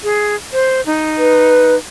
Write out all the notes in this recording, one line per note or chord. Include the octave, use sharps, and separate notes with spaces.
G#4
C5
D#4
B4